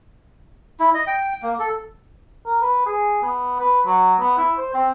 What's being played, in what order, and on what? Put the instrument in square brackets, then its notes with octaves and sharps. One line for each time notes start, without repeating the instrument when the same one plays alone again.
[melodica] E4
D#5
G5
A#3
A4
[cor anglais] A#4
B4
G#4
B3
B4
F#3
B3
E4
C5
C4